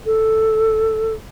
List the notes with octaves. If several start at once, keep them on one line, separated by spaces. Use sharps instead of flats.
A4